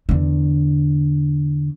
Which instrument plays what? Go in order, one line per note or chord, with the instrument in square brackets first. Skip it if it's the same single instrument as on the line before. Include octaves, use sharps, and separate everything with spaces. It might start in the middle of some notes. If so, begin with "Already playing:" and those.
[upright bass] E2 D3